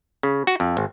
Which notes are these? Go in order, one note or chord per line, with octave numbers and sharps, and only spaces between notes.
C#3
F#4
F2
G#1